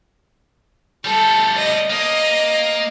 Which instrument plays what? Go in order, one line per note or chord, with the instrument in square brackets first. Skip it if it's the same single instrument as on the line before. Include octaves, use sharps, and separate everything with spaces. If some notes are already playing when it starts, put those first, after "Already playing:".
[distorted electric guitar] G3 A3 [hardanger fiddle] A4
[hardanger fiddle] D#5
[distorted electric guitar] A#3 [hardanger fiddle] D#5